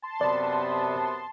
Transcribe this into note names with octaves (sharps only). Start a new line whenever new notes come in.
A5 C6
F#2 C3 B3 D5